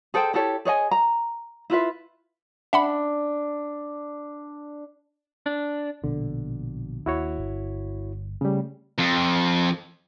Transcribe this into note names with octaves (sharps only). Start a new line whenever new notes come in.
G#4 A4 C5 G5
E4 G4 A4 C#5
G#4 C#5 D#5 G#5
A#5
E4 F4 B4 E5
D4 E5 F#5 B5
D4
A#1 B2 D3
D#2 E4 F#4 C#5
G1
C#3 G3 A3
F2